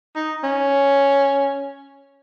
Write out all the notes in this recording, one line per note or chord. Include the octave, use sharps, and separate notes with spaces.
D#4
C#4